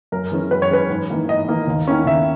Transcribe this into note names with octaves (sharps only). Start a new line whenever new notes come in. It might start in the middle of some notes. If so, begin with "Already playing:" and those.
F#2 A#4
E3 G#3 C#4
F#2 B4
C#5
E3 G#3 C#4 B4
G#2
E3 A#3 D#4
G#2 D#5
E3 A#3 D#4
D#2
D#3 A#3 C#4 E4
D#2 E5